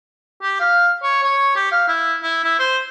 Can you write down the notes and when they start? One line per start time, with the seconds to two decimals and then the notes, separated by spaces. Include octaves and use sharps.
0.42 G4
0.60 F5
1.02 C#5
1.23 C#5
1.55 G4
1.71 F5
1.88 E4
2.23 E4
2.44 E4
2.59 C5